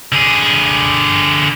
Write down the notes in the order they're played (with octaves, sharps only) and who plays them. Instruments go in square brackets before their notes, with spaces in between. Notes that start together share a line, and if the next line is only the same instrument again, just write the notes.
[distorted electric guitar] D3 G#4